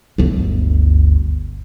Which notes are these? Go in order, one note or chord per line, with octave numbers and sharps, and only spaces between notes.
G1 D2